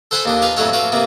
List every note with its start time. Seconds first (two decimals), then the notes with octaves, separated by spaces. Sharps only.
0.11 A4 C5 F#5 G#5 A5 B5
0.26 D#2 D4 D#5
0.42 F4 B4 F5 G#5
0.57 F2 A2 F#3 F#4 A4 C#5
0.73 F4 F#4 B4 D5
0.92 C3 A#3 B3